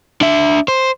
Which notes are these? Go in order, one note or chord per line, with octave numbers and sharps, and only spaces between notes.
D4 E5
C5